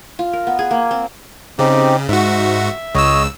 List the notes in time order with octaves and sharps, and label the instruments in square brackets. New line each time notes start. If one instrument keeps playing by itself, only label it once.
[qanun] F4
A#4
B3
G#4
A#3
C4
[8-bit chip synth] C#3 [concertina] C4 D#4 G4
[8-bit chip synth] G#2 F#4 [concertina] E5
[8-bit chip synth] C#2 E6 [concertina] C#5 D#5